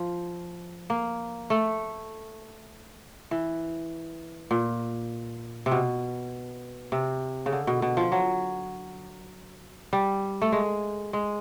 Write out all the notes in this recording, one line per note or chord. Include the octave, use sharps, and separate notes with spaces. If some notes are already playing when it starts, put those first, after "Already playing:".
Already playing: F3
A#3
A3
E3
A#2
C3
B2
C3
C#3
D3
B2
B2
F3
F#3
G3
A3
G#3
G#3